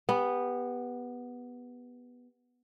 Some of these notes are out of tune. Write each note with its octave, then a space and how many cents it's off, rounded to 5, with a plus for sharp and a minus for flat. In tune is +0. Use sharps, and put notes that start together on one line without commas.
B3 -5 G4 +25